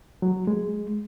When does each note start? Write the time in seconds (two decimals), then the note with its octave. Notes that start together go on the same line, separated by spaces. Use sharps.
0.22 F#3
0.47 G#3